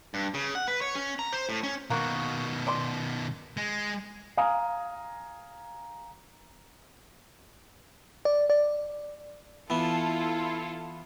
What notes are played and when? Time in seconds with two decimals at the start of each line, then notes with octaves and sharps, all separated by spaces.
0.14 G2
0.34 C#3
0.55 F#5
0.68 B4
0.81 C#5
0.95 C#4
1.19 A#5
1.33 C5
1.49 A2
1.63 C#4
1.90 B2 D#3 A#3 F#4
2.67 D5 C6
3.57 G#3
4.37 F5 G#5 A#5 D#6
8.25 D5
8.50 D5
9.70 E3 B3 E4 F4 A4